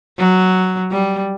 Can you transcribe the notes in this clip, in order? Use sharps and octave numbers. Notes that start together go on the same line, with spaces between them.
F#3
G3